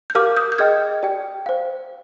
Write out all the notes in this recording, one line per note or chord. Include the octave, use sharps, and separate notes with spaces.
G6
G4 A#4 F5 D6 F6
D#6 G6
G6
G#4 D#5 G5 F6 G#6
G4 D5 G5
C5 F5